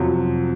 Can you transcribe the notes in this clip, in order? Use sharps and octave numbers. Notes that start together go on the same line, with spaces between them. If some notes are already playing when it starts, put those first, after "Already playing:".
Already playing: F2 C3 F#3